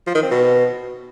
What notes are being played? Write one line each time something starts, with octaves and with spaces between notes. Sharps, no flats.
F3
D#3
C4
B2